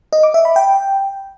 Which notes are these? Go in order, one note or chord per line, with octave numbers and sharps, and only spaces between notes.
D#5
D6
E5
B5
G5